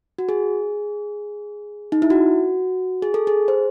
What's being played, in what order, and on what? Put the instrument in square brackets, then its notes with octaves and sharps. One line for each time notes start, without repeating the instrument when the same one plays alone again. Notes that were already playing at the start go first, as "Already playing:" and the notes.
[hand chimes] F#4
G#4
D#4
E4
F#4
G#4
A4
G#4
C5